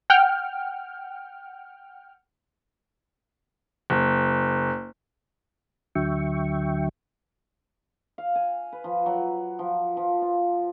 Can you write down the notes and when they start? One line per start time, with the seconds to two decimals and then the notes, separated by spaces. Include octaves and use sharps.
0.10 F#5 G5 F6
3.90 F#1
5.95 D2 D3 F#3 E5 G5 C#6
8.18 F5
8.35 G#5
8.72 B4
8.84 F3
9.06 F#3
9.59 F3
9.97 F3
10.22 F4